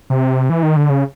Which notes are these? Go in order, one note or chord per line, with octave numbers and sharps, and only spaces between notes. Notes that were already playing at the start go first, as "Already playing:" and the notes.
C3
E3
D#3
D3
C#3